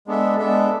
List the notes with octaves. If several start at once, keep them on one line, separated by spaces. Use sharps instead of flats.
G#3 B3 D4 A4 E5
G#3 B3 D4 A4 E5